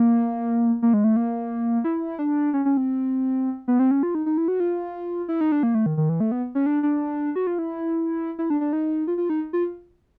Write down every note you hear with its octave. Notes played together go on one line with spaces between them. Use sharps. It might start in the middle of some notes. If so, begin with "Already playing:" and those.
Already playing: A#3
A#3
G#3
A3
A#3
E4
D4
C#4
C#4
C4
B3
C4
C#4
F4
D#4
D#4
E4
F#4
F4
E4
D#4
D4
A#3
A3
D#3
D#3
E3
A3
B3
C#4
D4
D4
F#4
F4
E4
E4
D4
D4
D#4
F4
F4
D#4
F4